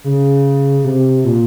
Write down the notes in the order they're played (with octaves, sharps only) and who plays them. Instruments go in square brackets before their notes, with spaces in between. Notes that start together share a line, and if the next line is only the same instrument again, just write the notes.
[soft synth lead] C#3
C3
A#2